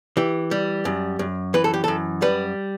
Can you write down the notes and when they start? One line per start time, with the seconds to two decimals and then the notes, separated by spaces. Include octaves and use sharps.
0.17 E3 G4
0.51 G3
0.85 F#2
1.19 F#2
1.54 E3 B4
1.64 A4
1.74 G4
1.84 F#2 A4
2.22 G3 B4